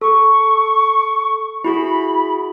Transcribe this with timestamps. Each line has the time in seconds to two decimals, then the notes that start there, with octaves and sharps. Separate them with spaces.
0.01 A4 C#6
1.64 E4 F#4 G#4 B5